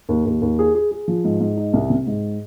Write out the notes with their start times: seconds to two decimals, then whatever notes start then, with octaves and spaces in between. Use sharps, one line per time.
0.09 D#2
0.26 D#2
0.42 D#2
0.59 G#4
0.75 G#4
0.91 G#4
1.08 F3
1.24 G#2
1.41 G#2
1.57 D#4
1.73 C2
1.90 C3
2.07 G#2